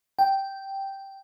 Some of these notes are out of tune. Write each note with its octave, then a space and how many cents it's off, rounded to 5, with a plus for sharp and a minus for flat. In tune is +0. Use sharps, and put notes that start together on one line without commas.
G5 -5